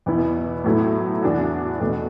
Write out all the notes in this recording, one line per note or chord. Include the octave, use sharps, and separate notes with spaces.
E2 B2 B3 E4
A2 F#3 A3 E4
E2 E3 D4 F#4
E2 B2 A3